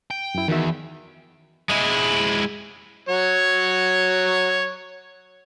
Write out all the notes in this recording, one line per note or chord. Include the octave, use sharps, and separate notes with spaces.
G5
F#2 E4
E2 D#3 F#4 E5
G#3 E4
F#3 C#5